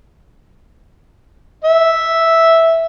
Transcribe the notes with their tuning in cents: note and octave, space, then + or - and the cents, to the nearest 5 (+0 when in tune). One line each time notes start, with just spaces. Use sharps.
E5 -5